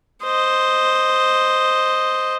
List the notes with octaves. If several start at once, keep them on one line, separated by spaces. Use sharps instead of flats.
C5 D#5